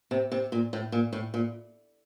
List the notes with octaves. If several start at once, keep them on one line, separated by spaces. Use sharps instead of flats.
C3
C3
A#2
A2
A#2
A2
A#2